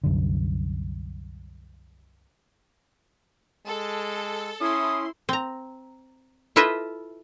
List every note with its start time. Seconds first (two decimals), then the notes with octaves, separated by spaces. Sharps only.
0.04 C2 F#2 D3
3.66 G#3 A4
4.61 C#4 E4 C6 D#6
5.29 C4 A#5
6.56 E4 F4 A4 B4 D#5 E5